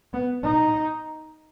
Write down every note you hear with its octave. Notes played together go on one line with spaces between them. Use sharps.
B3
D#4